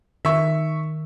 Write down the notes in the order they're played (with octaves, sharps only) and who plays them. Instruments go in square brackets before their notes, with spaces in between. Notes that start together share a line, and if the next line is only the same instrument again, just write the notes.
[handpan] D#3 [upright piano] E5 C#6